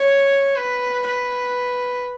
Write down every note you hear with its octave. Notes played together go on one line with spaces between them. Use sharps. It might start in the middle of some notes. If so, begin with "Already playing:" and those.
Already playing: C#5
B4
B4